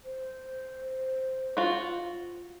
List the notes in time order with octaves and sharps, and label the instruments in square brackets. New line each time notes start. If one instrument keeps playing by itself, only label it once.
[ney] C5
[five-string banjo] F4 F#4